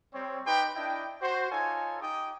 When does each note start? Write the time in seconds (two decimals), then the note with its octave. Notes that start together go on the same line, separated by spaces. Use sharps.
0.13 G3 C4 C#5
0.46 D#4 G4 B4 G5 B5 C6
0.75 D4 E4 D#5 G5
1.22 F#4 C5
1.51 D#4 F4 A4 C#5 G#5
2.02 D#4 G4 G5 D#6